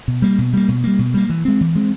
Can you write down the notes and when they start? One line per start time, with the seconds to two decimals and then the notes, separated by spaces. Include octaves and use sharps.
0.08 B2
0.22 G3 A#3
0.38 B2
0.53 G3 A#3
0.68 B2
0.84 G3 A#3
0.99 B2
1.14 G3 A#3
1.30 E3
1.45 G#3 C4
1.61 E3
1.75 G#3 C4